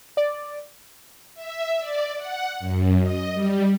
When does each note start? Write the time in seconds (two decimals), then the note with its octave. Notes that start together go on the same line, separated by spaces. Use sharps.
0.17 D5
1.34 E5
1.79 D5
2.17 F#5
2.59 F#2
3.00 D#5
3.33 G3